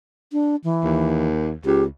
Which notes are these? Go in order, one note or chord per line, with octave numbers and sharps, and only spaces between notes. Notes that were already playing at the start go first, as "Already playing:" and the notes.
D4
E3
D#2
C#2 G4